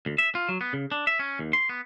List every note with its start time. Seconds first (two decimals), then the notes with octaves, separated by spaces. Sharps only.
0.06 D2
0.18 E5
0.35 F4
0.49 F#3
0.61 B3
0.73 C#3
0.92 D4
1.07 E5
1.19 C#4
1.39 D#2
1.53 C6
1.69 B3